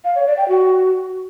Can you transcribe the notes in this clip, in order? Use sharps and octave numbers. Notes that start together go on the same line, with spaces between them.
F5
C#5
D5
G5
F#4